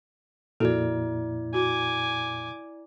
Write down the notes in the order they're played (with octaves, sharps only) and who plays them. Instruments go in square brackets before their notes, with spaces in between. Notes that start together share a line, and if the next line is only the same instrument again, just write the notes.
[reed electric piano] F2 A#2 [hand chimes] E4 D5 [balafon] F#4 A4
[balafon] F#4 [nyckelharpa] G#5 D6